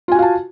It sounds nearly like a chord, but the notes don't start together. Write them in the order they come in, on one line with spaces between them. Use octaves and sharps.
F4 G#5 F#4 F5 A5